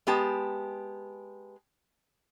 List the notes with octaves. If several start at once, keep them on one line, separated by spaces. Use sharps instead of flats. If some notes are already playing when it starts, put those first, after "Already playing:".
G#3 B3 G4 A5